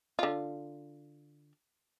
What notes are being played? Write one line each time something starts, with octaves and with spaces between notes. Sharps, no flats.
D3 F4